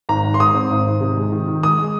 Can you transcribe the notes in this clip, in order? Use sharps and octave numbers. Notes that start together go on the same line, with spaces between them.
G#1 A#5
G#1
C6
G#2 D#6
C4
G#1
G#1
C3
G#3
D#3
D#3
G#3 D#6
G#3